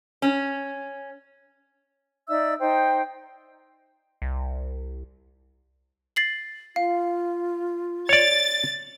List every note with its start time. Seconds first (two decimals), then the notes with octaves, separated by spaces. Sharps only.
0.22 C#4
2.29 D#4 D5 E5 E6
2.59 D#4 C5 G5
4.22 C2
6.16 A6 C7 F#7
6.76 F4 F5
8.09 C#5 D5 A6